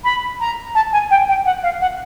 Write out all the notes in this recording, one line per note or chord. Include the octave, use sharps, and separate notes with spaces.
B5
A#5
A5
G#5
G5
G5
F#5
F5
F#5